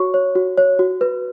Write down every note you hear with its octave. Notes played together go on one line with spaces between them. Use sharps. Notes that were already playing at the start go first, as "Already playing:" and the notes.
Already playing: F#4 C#5 C#6
C#5
F#4
C#5
F#4
B4